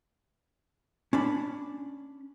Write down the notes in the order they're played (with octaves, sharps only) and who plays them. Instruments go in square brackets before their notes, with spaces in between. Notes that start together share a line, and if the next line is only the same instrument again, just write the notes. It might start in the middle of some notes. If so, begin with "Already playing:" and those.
[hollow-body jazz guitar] C#4 D4 B5